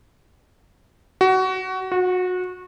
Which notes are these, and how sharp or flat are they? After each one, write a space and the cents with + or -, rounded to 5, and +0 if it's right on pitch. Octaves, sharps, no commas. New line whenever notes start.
F#4 +20
F#4 -25